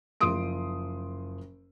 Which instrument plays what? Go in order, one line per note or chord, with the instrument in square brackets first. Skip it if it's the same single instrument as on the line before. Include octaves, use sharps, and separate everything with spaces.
[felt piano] F#1 F3 C6 D#6 D7